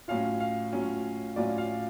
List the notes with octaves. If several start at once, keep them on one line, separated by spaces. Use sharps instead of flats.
A2 F#3 C#4 F4 F5
F5
A2 F#3 C#4 F4
A2 F#3 C#4 F4 D5
F5